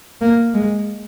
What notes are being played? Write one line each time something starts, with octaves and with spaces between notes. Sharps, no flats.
A#3
G#3